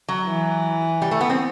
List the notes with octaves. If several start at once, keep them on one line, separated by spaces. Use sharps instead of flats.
F#3
E3
G3
A3
B3
C4